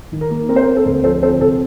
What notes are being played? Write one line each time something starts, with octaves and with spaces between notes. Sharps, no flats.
D#3
A#4
A#3
C4 A#4
C5
A#4
C4
A4
D2
F3 A4 C5
C4 A4 C5
C3 A4